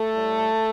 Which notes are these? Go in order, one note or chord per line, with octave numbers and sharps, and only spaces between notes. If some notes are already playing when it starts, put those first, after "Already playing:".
Already playing: A3 A4
A2 G3